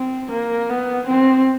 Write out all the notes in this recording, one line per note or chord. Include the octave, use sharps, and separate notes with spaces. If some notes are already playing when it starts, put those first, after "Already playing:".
Already playing: C4
A#3
B3
C4